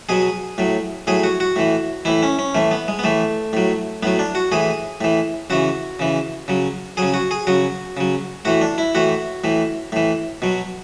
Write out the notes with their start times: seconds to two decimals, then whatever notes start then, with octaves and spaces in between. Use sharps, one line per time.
0.09 B2 F#3 G#4
0.58 A2 F#3
1.07 A2 F#3 G#4
1.23 F#4
1.40 F#4
1.56 A2 E3
2.05 A2 E3 E4
2.23 C#4
2.39 C#4
2.55 A2 E3 A3
2.71 B3
2.88 G#3
2.99 B3
3.04 A2 E3 A3
3.53 A2 F#3
4.03 A2 F#3 B3
4.19 D4
4.35 F#4
4.52 A2 E3 G#4
5.01 A2 E3
5.50 C#3 E3 F#4
5.99 C#3 E3
6.48 C#3 F#3
6.97 C#3 F#3 G#4
7.14 F#4
7.31 G#4
7.47 C#3 F#3 F#4
7.97 C#3 F#3
8.45 A2 E3 F#4
8.61 D4
8.78 E4
8.95 A2 E3 F#4
9.44 A2 E3
9.92 A2 E3
10.42 B2 F#3